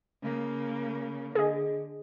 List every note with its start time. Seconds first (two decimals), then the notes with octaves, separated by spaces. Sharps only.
0.22 C#3 A#3
1.35 D3 G#4 D#5